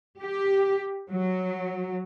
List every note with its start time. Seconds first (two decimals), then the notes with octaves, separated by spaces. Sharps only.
0.20 G4
1.11 F#3